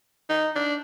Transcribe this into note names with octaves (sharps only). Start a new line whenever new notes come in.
D#4
D4